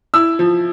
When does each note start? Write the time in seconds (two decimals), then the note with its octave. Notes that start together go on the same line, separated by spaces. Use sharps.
0.14 E4 E6
0.39 F3